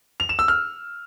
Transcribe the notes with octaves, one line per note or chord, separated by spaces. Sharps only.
F7
E7
E6
F6